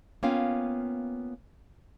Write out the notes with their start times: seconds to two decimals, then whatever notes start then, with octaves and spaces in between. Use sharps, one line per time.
0.23 A#3 B3 C#4 F4 F5 G5